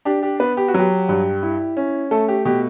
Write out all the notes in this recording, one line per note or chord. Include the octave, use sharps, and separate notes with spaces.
D4 G4
G4
B3 B4
G4
F#4
F#3 G4
G2
E4
C#4
A3 A4
G4
B2 G4